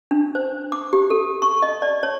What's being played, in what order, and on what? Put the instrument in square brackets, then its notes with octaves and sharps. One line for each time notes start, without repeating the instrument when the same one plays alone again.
[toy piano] D4
C5
D6
G4
A4
C#6
D#5
D5
C#5